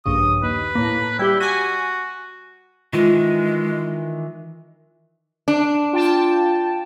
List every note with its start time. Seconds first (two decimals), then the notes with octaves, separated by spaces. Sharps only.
0.06 A#1 G2 C#3 D#6
0.43 D#2 B4
0.75 A2 A#3
1.19 G3 E4 G4
1.40 F#4 G#5 B6 D#7
2.93 D#3 E3 G#3 F4
5.48 D4
5.93 F4 G5 A5